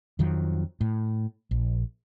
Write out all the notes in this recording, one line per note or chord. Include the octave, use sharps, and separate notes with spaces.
F2 D#3 F3 F#3
A2
A#1